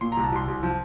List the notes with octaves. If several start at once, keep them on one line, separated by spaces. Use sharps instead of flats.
A#2 C6
C2 A#5
A5
C2 C6
C2
F3